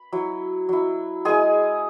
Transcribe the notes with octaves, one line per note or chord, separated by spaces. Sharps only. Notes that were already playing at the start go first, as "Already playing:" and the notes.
Already playing: B5
F#3 E4
F#3 E4
G#3 E4 G#4 G#5